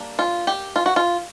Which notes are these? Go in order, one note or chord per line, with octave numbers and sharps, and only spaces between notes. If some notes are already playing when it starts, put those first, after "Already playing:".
Already playing: G3 A#3 D4
F4
G4
F4
F#4
F4